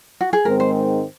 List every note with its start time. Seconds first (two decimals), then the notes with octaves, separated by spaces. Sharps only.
0.21 F#4
0.33 G#4
0.45 G#2 D#3 G#3 C4 A#4
0.60 C5